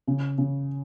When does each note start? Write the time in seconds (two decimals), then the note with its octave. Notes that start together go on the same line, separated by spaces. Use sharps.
0.08 C#3
0.38 C#3